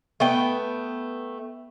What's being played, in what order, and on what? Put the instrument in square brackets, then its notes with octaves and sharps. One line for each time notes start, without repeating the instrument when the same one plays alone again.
[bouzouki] A3 B3 G5